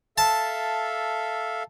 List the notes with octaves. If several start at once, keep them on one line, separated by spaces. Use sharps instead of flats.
A4 E5 F5 A5